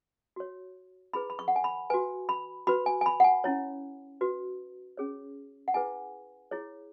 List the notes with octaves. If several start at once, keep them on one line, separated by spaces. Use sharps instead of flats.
F#4 C#5
E4 G#4 B4 B5
B5
C#6
F#5
G#5
B5
F#4 B4 G#5
B5
F#4 B4 B5
G#5
G#5
B5
F#5
G#5
C#4 E4 C#5
F#4 B4
C#4 G#4 C#5
F#5
E4 G#4 B4 G#5
E4 G#4 C#5